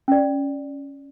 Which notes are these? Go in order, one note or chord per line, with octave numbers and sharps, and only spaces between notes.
C#4 D5